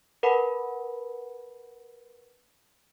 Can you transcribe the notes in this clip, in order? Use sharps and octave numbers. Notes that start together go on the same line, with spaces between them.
A#4 B4 F#5 A5 B5